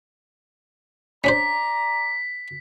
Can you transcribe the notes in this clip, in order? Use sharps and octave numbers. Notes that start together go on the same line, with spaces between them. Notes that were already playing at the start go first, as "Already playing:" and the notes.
C#4 D4 C5 D5 A#5 B6